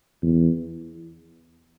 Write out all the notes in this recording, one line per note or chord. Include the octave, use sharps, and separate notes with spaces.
E2